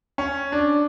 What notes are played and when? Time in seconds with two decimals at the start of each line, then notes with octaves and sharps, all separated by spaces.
0.18 C#4
0.52 D4